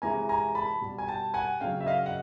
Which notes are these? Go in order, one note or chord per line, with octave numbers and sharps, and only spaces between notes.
C3 E3 G#3 G#5 A#5
G#5 A#5
A5 B5
B2 G3
G#5
G5 A5
F#5 G#5
C#3 F#3 F5 G5
E5
D#5 F5
F#5